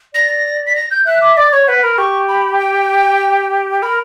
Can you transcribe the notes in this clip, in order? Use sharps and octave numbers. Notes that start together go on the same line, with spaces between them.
D5 A#6
B6
A#6
G6
E5 F#6
D6
D5 D6
C#5 C#6
B4 F#5
A#4 B5
G4 C#6
B5
G5
A#4 B5